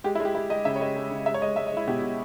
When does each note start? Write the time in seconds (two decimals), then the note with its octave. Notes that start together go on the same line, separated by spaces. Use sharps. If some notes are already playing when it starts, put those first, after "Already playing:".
0.04 G#3 G4
0.15 E4
0.20 G#3
0.25 G4
0.35 G#3 E4
0.50 G#3 D#5
0.65 C#3 E5
0.76 C#5
0.81 G#3 D#5
0.97 G#3
1.11 C#3
1.26 G#3 E5
1.34 C#5
1.42 G#3 D#5
1.56 G#3 E5
1.67 D#5
1.72 G#3 E4
1.88 B2 G4
2.02 B2